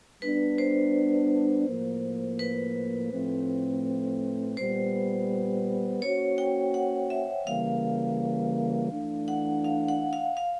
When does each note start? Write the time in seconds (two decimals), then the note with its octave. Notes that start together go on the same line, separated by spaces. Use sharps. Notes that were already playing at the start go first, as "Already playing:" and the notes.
0.22 G3 B3 D4 B4
0.58 C5
1.67 A2 F3 A#3
2.39 B4
3.12 A2 F3 A3 C4
4.57 A#2 G3 B3 C5
6.02 A#3 C#4 F#4 C#5
6.38 G5
6.74 F#5
7.10 E5
7.47 C#3 E3 G3 A#3 F5
8.92 E3 A3 D4
9.28 F#5
9.64 F5
9.88 F#5
10.13 F5
10.37 F5